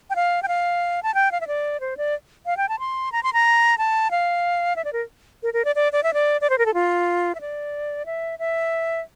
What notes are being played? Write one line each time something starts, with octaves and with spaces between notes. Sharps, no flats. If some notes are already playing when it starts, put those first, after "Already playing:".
G5
F5
G5
F5
A5
G5
F5
E5
D5
C5
D5
F5
G5
A5
C6
A#5
C6
A#5
A5
F5
E5
D5
A#4
A#4
A#4
D5
D5
D5
E5
D5
D5
C5
A#4
A4
F4
E5
D5
E5
E5